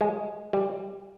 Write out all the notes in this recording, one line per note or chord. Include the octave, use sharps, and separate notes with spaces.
G#3
G3